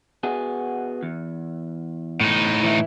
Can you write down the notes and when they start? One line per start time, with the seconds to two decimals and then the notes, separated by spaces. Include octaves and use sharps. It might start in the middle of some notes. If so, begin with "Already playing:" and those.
0.23 B3 F#4 G#4
1.03 E2
2.21 A2 D#4
2.63 E3 E4